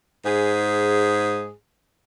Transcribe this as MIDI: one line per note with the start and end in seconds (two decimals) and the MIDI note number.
0.25 1.51 44
0.25 1.51 68